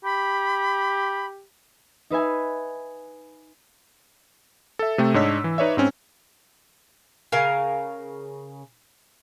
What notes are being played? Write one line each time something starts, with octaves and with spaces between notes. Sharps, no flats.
G4 B5
D#4 B4 E5 G#5
A4 E5
C3 A3 A4 G5
G#2 D4 C#5 D#5 E6 B6
E3
D#4 B4 C#5 D5 E5
G#2 C4 C#4
C#3 A#4 F5 G#5